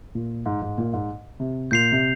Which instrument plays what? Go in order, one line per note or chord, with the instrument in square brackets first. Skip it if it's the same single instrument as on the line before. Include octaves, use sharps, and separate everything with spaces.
[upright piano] A#2
G#2
G#2
A#2
G#2
C3
[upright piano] A#2 [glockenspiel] G6 C7 F7
[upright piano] C3